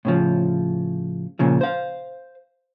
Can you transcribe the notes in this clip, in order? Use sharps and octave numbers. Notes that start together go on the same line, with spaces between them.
A2 C#3 F3
A#2 C#3 F3
C5 F5